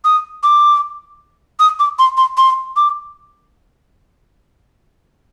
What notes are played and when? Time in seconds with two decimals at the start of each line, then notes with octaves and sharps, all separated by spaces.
0.04 D#6
0.43 D6
1.59 D#6
1.79 D6
1.99 C6
2.17 C6
2.37 C6
2.76 D6